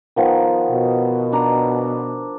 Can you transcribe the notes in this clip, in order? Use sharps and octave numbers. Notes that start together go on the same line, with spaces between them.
D#3 F3 B3
B2
D4 A#5